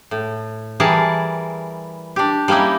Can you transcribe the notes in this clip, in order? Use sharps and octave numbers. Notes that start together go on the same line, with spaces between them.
A2
E3 G3 G#4 A#4 A5
D4 G4
G3 A#3 C#4 D#4 E4